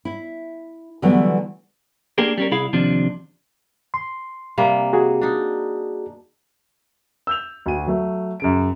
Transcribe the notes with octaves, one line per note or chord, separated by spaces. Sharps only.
E4
D3 E3 F#3 G3 A3 B3
A3 A#3 D4 G4 G#4 A#4
G3 C#4 A#4
C2 E4 G#4 F5 B5
D#2 C3 F3 D4
C6
C3 G3 A#3
F#4 G#4
D4 D#4
E6 G6 F7
D2 F#4 D#7
F#3 A3
F#2 C#3 D7